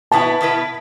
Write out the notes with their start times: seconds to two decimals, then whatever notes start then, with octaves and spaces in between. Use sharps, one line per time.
0.12 B2 B3 E4 B4 A5
0.41 B2 B3 E4 B4